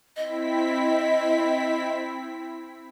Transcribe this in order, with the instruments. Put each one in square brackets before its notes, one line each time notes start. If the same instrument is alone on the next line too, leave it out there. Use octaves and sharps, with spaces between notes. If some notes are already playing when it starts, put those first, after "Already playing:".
[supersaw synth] C4 E4 B6 [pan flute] D#5